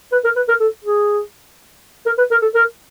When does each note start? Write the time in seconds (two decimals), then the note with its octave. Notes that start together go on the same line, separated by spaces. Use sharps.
0.12 B4
0.24 A#4
0.36 B4
0.48 A#4
0.60 A4
0.84 G#4
2.06 A#4
2.18 B4
2.31 A#4
2.42 A4
2.55 A#4